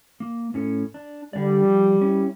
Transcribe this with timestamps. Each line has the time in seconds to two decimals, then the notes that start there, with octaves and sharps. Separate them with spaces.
0.20 A#3
0.54 A2 C#4 A4
0.94 D4
1.33 D3 G3 D5
1.63 F3
2.01 C#4 E4